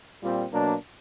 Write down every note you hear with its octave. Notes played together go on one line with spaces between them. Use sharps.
A#2 G3 C4 F4
B2 F#3 A#3 D4